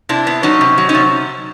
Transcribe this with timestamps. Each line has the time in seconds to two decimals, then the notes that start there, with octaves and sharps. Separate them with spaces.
0.09 C3 D4 E4
0.27 B3
0.43 F#3 C#4 D#4
0.61 C3
0.78 F#3
0.89 C#4 D#4
0.94 C3